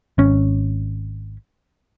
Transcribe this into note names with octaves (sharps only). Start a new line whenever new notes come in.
G#1 C#4